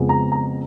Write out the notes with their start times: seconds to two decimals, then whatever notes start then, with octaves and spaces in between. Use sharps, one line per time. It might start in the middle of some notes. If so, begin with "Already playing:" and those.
Already playing: F2 C#3 G#3 B3
0.09 A#5
0.32 A#5